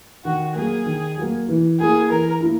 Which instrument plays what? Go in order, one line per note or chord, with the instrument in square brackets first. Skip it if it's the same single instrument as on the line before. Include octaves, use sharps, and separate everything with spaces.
[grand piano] D#3 [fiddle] F#4
[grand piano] F#3 A#3 [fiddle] G#4
[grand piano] D#3
F#3 A#3
E3
[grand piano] A#3 E4 [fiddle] G#4
[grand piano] E3 [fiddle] A#4
[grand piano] A#3 E4